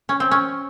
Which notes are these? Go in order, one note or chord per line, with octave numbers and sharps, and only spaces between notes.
C#4
C4
C#4